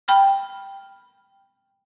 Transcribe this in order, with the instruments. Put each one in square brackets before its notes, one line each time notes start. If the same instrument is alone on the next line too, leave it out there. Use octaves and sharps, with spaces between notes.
[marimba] G5 B5 F6